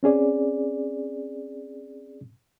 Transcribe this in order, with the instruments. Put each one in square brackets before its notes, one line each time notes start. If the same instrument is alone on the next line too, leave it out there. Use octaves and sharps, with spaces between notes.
[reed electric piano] C4 C#4 G#4 D5